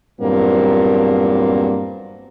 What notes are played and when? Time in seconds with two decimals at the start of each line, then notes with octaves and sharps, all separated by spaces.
0.20 E2 G2 A#2 F#3 A#3 C4